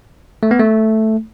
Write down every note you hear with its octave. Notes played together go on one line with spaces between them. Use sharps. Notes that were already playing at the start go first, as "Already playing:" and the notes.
A3
B3
A3